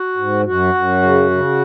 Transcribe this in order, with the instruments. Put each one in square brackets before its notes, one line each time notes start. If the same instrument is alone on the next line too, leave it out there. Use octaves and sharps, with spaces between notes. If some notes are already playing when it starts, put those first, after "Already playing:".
Already playing: [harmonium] F#4
G#2
F#2 F#4
F#2
C#3
C#3